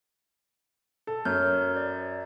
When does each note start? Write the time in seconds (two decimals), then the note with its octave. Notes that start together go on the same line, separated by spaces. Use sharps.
1.07 A4
1.25 F#2 C#5 F6 G6
1.76 D5